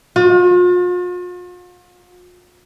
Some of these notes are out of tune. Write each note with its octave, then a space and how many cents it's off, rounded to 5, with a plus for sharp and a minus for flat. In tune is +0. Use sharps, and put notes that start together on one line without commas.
F4 +45